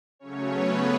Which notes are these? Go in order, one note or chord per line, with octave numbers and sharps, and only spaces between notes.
C#3 F#3 A3 C#4 C#5
B3 B4